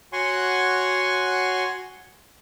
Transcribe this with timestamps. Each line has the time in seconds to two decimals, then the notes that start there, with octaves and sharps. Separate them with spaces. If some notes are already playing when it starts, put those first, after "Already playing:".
0.13 F#4 C#5 F#5 G#5 C6 C#6